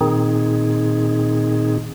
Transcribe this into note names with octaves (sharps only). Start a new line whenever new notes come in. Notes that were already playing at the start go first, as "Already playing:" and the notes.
A#2 D#3 C4 D#4 G#4